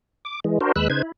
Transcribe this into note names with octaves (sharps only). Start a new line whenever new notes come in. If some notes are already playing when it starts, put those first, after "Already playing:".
D6
E3 G#3
D4 F#4 A#4 C5
D#2 G#3 B4 E6 F#6
C#3 D#4 B4 C5 G#6
E4